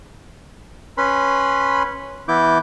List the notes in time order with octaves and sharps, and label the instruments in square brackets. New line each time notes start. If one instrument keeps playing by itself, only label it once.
[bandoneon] C#4 B4 B5 C6
E3 B3 E4 D6 G6